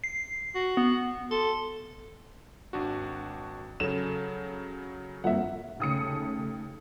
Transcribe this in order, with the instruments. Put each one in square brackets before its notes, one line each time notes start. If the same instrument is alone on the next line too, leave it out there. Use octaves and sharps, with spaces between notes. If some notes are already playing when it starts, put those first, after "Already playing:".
[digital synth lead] C7
[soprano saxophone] F#4
[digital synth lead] B3
[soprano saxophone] A4 [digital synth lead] C6
[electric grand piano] G#1 D4 F#4
[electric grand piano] C#3 F#3 [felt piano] A4 [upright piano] E7
[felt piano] G1 F2 A#3 [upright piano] E5 F#5
[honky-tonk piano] D#2 D#6 C#7 [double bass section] C#3 A3